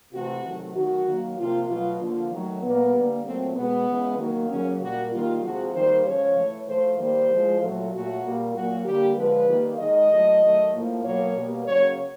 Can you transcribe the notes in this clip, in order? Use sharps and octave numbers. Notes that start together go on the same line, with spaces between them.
C3 E3 A3 F#4
C3 D#3 F#3 A3
D#3 F#3 A3 F#4
D#3 F#3 A#3
C3 F3 A#3 F4
B2 F#3 A3 F4
D3 F3 A#3 F4
D#3 F#3 A3
A#2 G3 A#3 B3
D3 G3 A#3
A#2 F#3 A3 C4
B2 G#3 B3
C#3 E3 G#3
D#3 F#3 A#3
C#3 F#3 A#3 C#4
A#2 G3 A#3 F#4
D#3 G3 A#3 F4
C3 F3 G#3 F#4
D#3 G3 A#3 C5
C#3 F3 G#3 C#5
A2 E3 A3
A2 F3 A3 C5
D#3 G3 A#3 C5
A2 F3 G#3
A#2 F#3 A3
A#2 F#3 A3 F#4
A#2 G3 A#3
A#2 F#3 A#3 F#4
D3 G3 A#3 G4
D3 F3 G#3 B4
D#3 G3 A#3
D#3 G#3 D#5
A2 F#3 A3
D#3 F#3 A3
A2 F3 A#3
B2 F#3 A#3 C#5
B2 G3 A#3
C#3 F#3 A#3 C#5